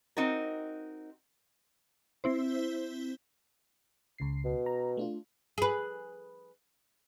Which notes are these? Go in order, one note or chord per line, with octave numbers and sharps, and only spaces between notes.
C4 D#4 F#4 A#4
C4 E4 C5
C#2 C#3 C7
B2
A#5
A3 D4 F4
G#4 B4